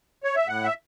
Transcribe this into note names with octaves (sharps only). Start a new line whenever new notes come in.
C#5
E5
A2 F#5
E5